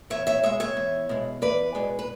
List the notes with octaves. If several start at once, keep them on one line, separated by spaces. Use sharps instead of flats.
E2 C#5 E5
C#5 E5
B2 G#3 C#5 E5
C#5 E5
E2
B2 G#3
E2 B4 D5
B2 G#3
B4